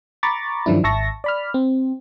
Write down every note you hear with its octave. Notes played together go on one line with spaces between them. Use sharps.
A#5 B5 C#6 D6 A6
G2 D#3 F3 F#3 D4 E4
G#1 E5 A5 C#6 A#6
D5 B5 F6
C4